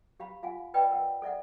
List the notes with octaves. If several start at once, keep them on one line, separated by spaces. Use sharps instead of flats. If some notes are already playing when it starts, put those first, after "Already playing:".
G4 F5 B5
F4 F5 F#5 G#5
B4 D5 D#5 G5 B5
A#4 F#5
A4 D5 E5 F#5